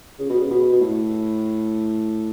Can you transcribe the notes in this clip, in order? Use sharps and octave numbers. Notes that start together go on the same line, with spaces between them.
C#3
B2
C#3
B2
B2
A2